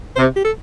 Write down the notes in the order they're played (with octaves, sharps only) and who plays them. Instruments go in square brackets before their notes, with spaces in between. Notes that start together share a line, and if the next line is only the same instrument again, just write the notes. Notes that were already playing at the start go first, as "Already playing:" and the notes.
[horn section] C3 [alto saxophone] C5
[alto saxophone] G4
A4